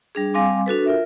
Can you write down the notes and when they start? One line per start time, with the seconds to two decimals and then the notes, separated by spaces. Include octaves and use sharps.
0.15 G3 D4 G#4
0.34 G3 C4 F5 G#5 C6 D6
0.66 D4 F#4 A4 B4
0.86 F4 A#4 E5